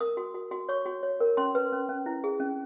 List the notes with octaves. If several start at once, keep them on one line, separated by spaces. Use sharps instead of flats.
A#4 D#6
F#4
F#4
F#4
C#5 C#6
F#4
C#5
A#4
C#4 C6
B4
C#4
C#4
E4
G#4
C#4